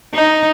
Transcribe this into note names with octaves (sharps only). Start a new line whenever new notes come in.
D#4